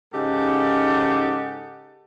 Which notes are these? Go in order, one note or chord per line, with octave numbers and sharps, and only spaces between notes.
G#2 C#3 D#4 G4 A4 F#5